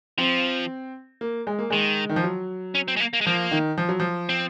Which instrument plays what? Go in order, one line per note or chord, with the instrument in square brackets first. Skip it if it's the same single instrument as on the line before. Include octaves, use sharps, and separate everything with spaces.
[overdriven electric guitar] F3 [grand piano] C4
[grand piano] A#3
G#3
A#3
[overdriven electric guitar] D#3 [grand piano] G#3
[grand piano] D#3
F3
F#3
[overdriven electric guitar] C#4
C4
G#3
A#3
A#3
G#3
[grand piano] F3 [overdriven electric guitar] A#3
[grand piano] D#3
F3
F#3
F3
[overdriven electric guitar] C4